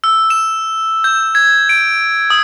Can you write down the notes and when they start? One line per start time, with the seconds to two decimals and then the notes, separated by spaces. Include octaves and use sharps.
0.04 E6
0.30 E7
1.04 G6
1.35 G#6
1.69 D7
2.30 D#6